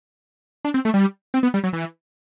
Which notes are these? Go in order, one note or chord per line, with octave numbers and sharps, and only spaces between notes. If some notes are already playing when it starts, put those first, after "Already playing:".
D4
C4
A3
G3
C4
B3
G3
F#3
E3